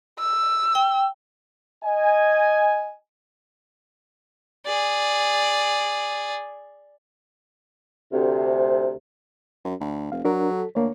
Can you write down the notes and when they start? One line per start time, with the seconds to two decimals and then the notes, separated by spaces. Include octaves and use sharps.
0.19 E6
0.75 G5
1.84 D#5 G#5
4.66 G#4 D5
8.12 D2 C3
9.65 F#2
9.81 D2
10.12 F1 F5
10.25 F#3 D4 A#4
10.52 A4
10.75 D2 A#3 C#5